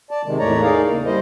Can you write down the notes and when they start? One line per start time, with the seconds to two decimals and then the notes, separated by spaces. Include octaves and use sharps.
0.11 D5 A5
0.26 C3 D#3 G#3
0.39 E2 A2 A3 C#5 D5 A#5
0.62 D#4 G#4 A#4 D5 F5
0.87 C#3 A#3
1.05 G3 E4 C5 D#5